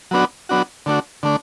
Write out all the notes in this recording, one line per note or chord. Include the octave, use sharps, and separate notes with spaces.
F#3 B3 D4 F#4
F#3 B3 D4 F#4
D3 A3 D4 F#4
D3 A3 D4